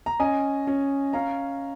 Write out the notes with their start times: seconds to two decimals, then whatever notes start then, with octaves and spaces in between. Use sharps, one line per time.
0.06 A#5
0.20 C#4 D#5 G#5
0.67 C#4
1.13 C#4 F5 A#5